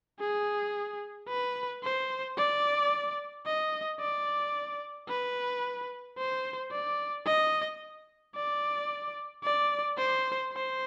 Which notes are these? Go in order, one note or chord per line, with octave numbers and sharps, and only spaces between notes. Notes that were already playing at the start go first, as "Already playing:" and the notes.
G#4
B4
C5
D5
D#5
D5
B4
C5
D5
D#5
D5
D5
C5
C5